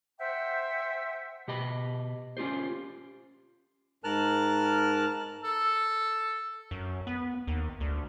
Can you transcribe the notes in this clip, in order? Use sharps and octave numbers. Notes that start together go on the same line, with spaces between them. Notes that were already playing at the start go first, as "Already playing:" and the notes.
C5 E5 F#5 G5
B2 G4 D#5 B5
C#4 F4 G4 C5
G#2 A#4 A5 F6 F#6
A4
F#2
B3
D#2
D2